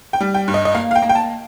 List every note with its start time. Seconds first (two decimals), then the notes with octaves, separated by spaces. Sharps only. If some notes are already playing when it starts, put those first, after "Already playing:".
0.13 G5
0.21 G3
0.34 G5
0.48 G2
0.54 D#5
0.65 D#5
0.75 A#3 F5
0.91 F5
0.95 G5
1.02 A#3
1.09 G5
1.15 A5